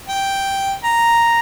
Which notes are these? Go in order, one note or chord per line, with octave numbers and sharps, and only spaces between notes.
G5
A#5